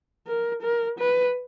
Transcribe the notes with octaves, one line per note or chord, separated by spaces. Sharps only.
A#4
A#4
B4